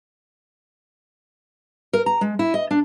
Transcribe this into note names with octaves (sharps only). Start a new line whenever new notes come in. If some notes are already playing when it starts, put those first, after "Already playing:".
A#4
A#5
G#3
E4
D#5
D4